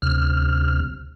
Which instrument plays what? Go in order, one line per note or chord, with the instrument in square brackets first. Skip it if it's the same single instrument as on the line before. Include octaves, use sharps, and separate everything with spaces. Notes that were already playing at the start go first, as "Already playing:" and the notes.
[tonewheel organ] D2 C3 F6